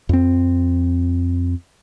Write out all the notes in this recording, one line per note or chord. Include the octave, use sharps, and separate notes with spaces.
F2 C4